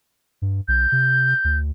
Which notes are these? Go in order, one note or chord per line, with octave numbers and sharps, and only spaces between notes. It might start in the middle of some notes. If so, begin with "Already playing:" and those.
G2
B1 G6
C3
D2